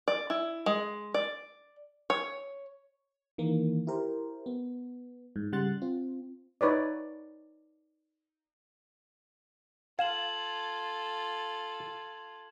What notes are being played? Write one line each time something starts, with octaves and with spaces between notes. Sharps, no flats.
D5
E4
G#3
D5
C#5
D#3 E3 A#3
E4 G4 A#4 C5
B3
G#2
C#3 G3 F#5 C6 F#6 A6
C4 F4
D#4 B4 C#5 D5
F4 A4 F5 G#6 E7 F#7